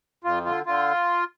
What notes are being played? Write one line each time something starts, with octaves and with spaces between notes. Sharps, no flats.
F2 F4
D3 F4
D3 F4